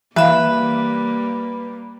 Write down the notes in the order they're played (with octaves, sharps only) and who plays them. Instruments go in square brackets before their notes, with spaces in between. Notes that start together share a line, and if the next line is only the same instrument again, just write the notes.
[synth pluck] E3 E7 [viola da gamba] G3 A#3 [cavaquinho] B4 [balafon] E5 F5